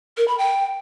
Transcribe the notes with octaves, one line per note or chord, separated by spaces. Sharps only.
A#4
B5
G5